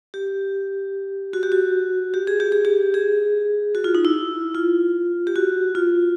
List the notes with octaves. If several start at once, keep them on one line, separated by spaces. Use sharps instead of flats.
G4
F#4
G4
F#4
G4
G#4
G4
G#4
G4
G#4
F#4
F4
D#4
E4
F4
G4
F#4
F4